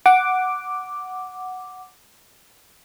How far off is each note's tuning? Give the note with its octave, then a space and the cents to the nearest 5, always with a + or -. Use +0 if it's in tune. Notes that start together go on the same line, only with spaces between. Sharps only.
F#5 +0 D6 +0